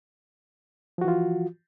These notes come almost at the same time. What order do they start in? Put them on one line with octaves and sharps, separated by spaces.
F3 F#4 E3 F4